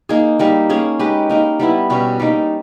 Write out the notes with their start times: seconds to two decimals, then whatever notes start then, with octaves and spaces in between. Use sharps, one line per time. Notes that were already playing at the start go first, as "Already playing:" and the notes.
0.09 A#3 D#4 G#4
0.39 G3 A#3 D#4
0.70 A#3 C#4 G#4
0.99 G#3 D#4 G4 B4
1.29 A#3 D#4 A#4
1.59 G3 B3 E4
1.90 B2 G3 C#4
2.20 G3 A#3 D#4